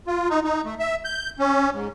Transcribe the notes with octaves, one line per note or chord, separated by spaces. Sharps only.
F4
D#4
D#4
A3
E5
G6
C#4
G#2